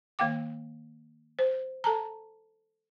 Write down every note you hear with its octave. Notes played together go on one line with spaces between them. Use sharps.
D#3 A#3 F5 G5 D6
C5
A4 A5 A#5